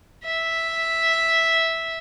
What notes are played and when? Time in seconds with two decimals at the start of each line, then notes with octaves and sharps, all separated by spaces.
0.24 E5